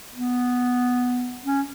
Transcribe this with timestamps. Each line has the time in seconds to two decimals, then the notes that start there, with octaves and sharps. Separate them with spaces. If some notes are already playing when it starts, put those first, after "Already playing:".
0.15 B3
1.44 C#4